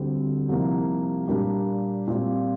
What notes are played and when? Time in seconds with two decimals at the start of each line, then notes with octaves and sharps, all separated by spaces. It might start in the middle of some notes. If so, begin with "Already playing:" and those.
Already playing: D2 D3 G3 C4
0.49 C2 C3 F3 A#3
1.28 A#2 G3 A#3 D4 G4
2.07 A#2 G3 C4 F4